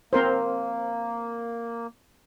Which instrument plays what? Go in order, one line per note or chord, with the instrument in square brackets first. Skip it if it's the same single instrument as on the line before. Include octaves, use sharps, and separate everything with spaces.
[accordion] A#3 [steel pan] C4 A#4 C5